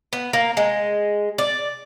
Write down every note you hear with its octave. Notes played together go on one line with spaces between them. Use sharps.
B3
A#3
G#3
D5